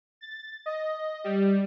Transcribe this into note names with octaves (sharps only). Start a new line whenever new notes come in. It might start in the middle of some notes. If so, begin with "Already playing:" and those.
A6
D#5
G3